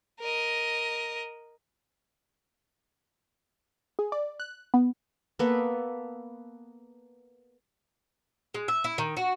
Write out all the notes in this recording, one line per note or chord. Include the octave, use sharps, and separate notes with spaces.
A#4 D#5
G#4
D5
F#6
B3
A#3 B3 A4 B4
G#3
E5
E4
D#3
F#4